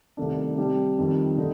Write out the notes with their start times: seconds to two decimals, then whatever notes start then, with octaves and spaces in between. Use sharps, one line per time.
0.17 C2 C3 D#3 A3 D4
0.57 C3 G3 D4 G4
0.98 F2 D#3 G3
1.38 D3 A3 D#4